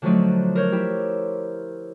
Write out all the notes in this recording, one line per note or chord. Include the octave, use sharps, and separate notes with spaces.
D3 F3 F#3 A3 D4 D#4
A#4 C5 C#5
E4 G4